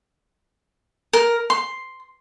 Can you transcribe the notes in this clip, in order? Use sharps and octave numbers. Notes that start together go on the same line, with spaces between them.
A#4
C6